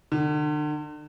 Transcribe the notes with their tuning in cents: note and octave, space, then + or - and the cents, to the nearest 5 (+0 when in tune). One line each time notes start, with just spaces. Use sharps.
D3 +40